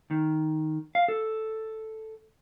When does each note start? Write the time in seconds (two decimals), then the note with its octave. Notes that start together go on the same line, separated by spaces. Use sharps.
0.11 D#3
0.95 F5
1.08 A4